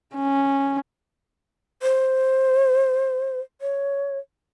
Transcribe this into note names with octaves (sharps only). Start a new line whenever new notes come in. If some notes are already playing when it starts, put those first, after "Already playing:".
C#4
C5
C#5